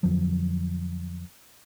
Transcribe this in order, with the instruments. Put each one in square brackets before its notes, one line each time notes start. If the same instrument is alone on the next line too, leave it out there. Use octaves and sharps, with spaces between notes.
[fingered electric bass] F2 D3 F3 F#3